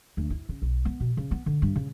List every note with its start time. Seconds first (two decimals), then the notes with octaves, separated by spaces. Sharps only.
0.17 D2
0.30 E4
0.49 C#3
0.62 B1
0.85 B3
1.00 B2
1.17 C#3
1.31 B3
1.46 D3
1.62 G2
1.76 C#3